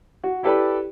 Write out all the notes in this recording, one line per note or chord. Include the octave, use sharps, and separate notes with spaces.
F#4
E4 G4 A4 B4 D5